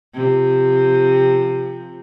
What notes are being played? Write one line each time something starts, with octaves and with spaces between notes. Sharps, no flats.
C3 F3